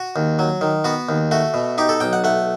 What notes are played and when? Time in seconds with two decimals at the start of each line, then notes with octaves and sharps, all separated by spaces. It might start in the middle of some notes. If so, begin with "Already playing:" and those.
Already playing: F#4
0.16 D#2
0.39 F#3
0.61 D#3
0.84 B3 F#4
1.09 D#2
1.31 A3 F#4
1.54 B2
1.78 D#4 G4
1.89 A4
2.00 B1 G5
2.13 F#5
2.24 A3 F#5